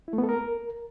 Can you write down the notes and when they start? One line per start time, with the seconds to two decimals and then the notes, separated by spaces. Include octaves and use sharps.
0.08 E4
0.13 A3
0.18 B3
0.24 A4
0.29 A#4